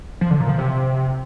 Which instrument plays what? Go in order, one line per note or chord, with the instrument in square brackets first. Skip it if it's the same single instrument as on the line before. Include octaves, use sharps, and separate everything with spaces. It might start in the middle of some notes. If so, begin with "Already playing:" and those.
[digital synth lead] F3
D3
A#2
F3
C3